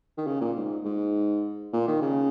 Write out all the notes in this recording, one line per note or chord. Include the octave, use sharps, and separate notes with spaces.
D#3
C#3
A#2
G#2
G#2
A#2
D#3
C#3